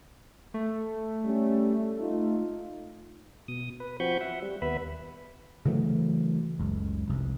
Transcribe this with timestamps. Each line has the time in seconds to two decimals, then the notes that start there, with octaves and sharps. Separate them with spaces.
0.54 A3
1.25 G3 C#4
2.00 D#4 F4
3.48 B2 D#6
3.80 B4
4.00 F3 C4 F#4 B5 C#6 G6
4.21 E5 F#5
4.42 G3
4.62 D#2 B3 B4 E5 B5
5.65 C#3 E3 F#3 A3
6.59 F#1 C#2
7.08 F1 C2